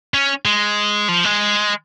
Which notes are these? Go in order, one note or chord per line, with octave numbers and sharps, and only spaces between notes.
C#4
G#3
F3
G#3